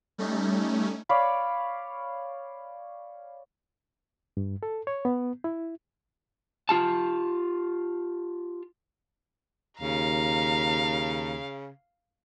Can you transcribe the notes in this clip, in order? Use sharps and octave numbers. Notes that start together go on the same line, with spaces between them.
G3 A3 C#4 D#4
C#5 D5 F5 B5
G2
A4
C#5
B3
E4
F4 G4 A5
D#2 C#3 F5 A#5